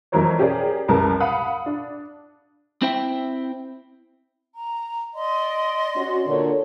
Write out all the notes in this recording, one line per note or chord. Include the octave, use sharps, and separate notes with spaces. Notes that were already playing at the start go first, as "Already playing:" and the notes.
F2 E3 F#3 A#4 C5 C#5
C#4 G4 G#4 A#4 D5
C2 F#2 A#4 B4 A5
F5 F#5 B5 D#6
D4
C4 E4 C5 E5 G5
A#5
D5 D#5 C6
C#4 F#4
A#2 D3 C#5